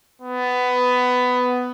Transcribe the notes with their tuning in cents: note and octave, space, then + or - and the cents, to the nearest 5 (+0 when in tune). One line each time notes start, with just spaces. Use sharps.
B3 +15